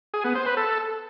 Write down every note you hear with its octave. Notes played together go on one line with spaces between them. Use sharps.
G#4
B3
C5
B4
A4